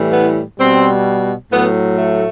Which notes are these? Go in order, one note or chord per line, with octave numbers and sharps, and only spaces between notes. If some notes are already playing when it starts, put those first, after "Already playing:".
Already playing: A2 E3 G3
B3
B2 G3 C4
A2 F#3 B3
A3